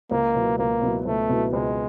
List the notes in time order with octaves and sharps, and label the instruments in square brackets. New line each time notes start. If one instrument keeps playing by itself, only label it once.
[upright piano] C#2 [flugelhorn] A#3
[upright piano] B2 F#3 B3 E4
[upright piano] C#2 [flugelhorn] A#3
[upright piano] B2 F#3 B3 E4
[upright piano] C#2 [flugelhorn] A3
[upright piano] B2 F#3 B3 E4
[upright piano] C#2 [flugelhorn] G#3